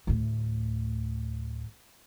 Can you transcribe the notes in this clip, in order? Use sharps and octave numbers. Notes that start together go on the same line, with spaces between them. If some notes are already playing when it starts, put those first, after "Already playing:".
D2 A2